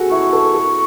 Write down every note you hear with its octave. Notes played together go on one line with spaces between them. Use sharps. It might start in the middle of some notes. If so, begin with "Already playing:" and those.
Already playing: F#4 G#4 A4
E4 C#6
A4
A4